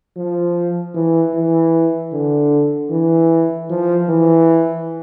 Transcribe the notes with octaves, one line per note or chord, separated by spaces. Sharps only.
F3
E3
E3
D3
E3
F3
E3